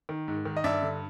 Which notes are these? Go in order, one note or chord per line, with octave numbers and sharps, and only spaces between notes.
D#3
G#2
D#3
D#5
G2 D5 E5
D3